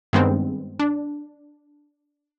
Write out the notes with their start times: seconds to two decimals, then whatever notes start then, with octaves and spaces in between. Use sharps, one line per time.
0.13 G2 D#3 G#3 B3 C4
0.79 D4